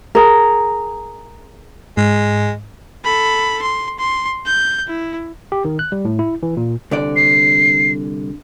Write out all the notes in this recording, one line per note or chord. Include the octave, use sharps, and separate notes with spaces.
G#4 A#4
G#2 G#3
A4 B5
C6
C6
G6
E4
G4
D#3
F#6
G3
A2
E4
E3
A#2
C2 D3 D5
C7